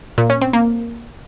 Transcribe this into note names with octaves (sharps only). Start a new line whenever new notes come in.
A#2
C#4
C4
A#3